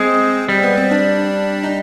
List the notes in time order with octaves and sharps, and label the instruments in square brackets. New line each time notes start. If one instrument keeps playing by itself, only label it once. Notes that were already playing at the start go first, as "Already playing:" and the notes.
Already playing: [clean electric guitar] G#3 [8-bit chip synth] C4
[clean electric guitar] G3 [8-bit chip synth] C4
[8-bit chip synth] B3
C4
D4
D#4